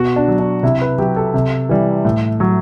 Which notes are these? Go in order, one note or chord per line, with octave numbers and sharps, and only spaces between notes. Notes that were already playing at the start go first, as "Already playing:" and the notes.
Already playing: B2 F#4
D4
F#3
D4
C3 E4
B4
F#3 G4
A4
C3
E3 G3
A2
F#3